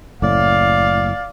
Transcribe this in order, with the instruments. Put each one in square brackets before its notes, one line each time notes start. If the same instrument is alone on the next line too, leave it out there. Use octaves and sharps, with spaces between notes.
[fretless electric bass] F#1 A2 [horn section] D5 F5